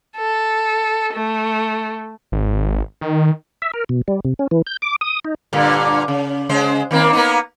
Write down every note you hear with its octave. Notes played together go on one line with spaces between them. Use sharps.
A4
A3
G#1
D#3
E5
A#4
B2
G3
C3
C#4
E3
G6
D6
D#6
D#4
G2 A#2 D3
C#3
C#3 G#3 C5
D#3 A#3 C4
A#3 B3 D#4